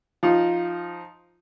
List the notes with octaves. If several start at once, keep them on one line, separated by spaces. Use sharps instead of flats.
F3 D#4 F4